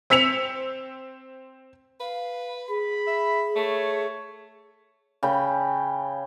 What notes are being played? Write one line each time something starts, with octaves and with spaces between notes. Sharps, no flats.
C4 E6 B6 C#7 F7
B4 F5
G#4 B5
E5
A3 C#5
C#3 G5 B5